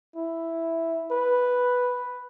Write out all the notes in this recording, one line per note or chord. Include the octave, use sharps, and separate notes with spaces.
E4
B4